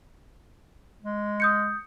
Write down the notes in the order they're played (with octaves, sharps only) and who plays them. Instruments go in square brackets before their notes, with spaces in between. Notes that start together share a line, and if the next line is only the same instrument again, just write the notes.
[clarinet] G#3
[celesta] D#6 G6 C#7